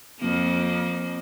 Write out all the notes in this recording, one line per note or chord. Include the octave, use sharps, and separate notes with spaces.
F2 A#3